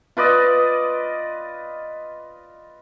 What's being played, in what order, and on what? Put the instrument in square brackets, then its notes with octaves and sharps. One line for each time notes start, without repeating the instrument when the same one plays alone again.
[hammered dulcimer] F4 B4 D5 D#5